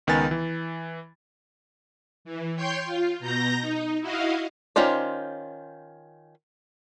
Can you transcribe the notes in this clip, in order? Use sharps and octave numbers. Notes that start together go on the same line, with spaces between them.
C#2 D#3 B3 B4 G#5 A6
E3
E3
C#5 G5 C6 G6
F4
B2 A#5 G6 A#6
D#4
E4 F#4 D#5 F5
D#3 C#4 F4 C5 D5